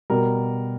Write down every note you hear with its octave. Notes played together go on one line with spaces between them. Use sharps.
B2 G3 A#4